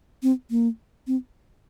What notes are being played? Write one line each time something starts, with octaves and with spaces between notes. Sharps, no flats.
C4
A#3
C4